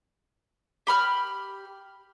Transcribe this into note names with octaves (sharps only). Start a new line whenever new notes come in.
G4 B5 F6